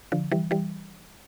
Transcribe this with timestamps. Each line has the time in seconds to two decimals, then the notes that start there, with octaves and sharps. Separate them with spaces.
0.12 D3 F3
0.32 E3 G3
0.51 E3 G3